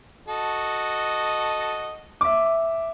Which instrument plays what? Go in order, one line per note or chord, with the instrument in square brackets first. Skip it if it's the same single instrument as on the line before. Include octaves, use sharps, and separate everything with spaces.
[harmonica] F#4 A4 D#5
[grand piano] E5 D6